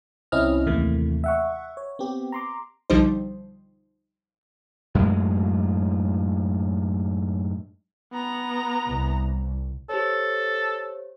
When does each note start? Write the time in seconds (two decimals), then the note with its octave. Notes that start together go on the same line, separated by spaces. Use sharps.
0.32 C2 C4 C#4 E4 D#5 F6
0.66 D#2 A2 C3 E3 A3 A#3
1.24 E5 F#5 C#6
1.77 C#5
1.99 B3 C4 G4
2.32 A#5 C6 D6
2.90 B1 D3 F3 G3 D#4 C5
4.95 F#2 A2 G#3
8.13 B3 A#5
8.88 C2
9.89 G4 A4 C5 C#5